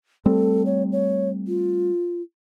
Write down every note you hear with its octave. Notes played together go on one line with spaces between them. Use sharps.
G3 A3 C4 A4
C#5
C#5
F4